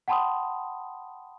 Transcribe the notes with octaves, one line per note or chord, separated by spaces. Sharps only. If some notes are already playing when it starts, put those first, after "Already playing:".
F#5 G5 A5 B5 C6 D#6